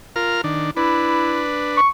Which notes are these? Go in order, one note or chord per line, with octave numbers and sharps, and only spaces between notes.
F4 A#4 F6
D#3 D4
D4 E4 B4
C#6